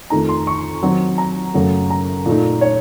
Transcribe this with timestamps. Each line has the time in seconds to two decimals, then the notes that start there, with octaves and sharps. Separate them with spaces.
0.10 F2 D#3 A3 D#4 A#5
0.29 C6
0.47 C#6
0.83 D#3 F#3 C4 D#4
1.18 A#5
1.54 F#2 C#3 F#3 A3
1.90 A#5
2.26 A#2 A3 D#4
2.61 C#5